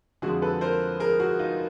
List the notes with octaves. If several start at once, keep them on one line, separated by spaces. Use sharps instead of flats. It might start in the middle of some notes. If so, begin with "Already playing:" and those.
F2 D3 F3 G#3 F#4 G#4
A4 B4
A#4 C5
G#4 A#4
F#4 G#4
D#4 F4